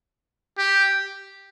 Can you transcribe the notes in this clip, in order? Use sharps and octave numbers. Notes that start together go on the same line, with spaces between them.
G4